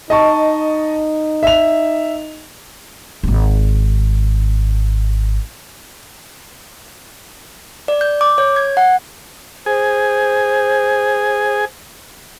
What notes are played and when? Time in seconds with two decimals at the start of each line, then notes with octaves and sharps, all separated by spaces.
0.10 D#4 D#5 A5 C#6
1.43 E5 F7
3.23 D1 G#1
7.88 D5
8.01 G6
8.21 D6
8.38 C#5
8.56 G#6
8.77 F#5
9.66 G#4 C5